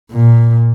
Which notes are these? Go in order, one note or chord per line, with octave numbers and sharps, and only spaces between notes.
A#2